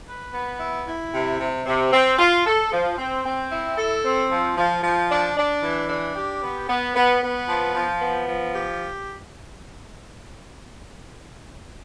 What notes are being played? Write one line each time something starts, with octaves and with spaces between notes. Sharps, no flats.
B4
B3
E4
E4
C3
C3
C3
C4
F4
A4
F3
C4
C4
E4
A4
C4
F3
F3
F3
D4
D4
E3
D4
G4
B3
B3
B3
B3
F3
F3
B3
F3
G4